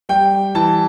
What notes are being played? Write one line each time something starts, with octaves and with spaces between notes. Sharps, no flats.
G3 G5
E3 A5